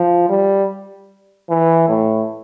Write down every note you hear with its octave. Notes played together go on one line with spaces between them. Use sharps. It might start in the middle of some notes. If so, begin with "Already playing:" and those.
Already playing: F3
G3
E3
A2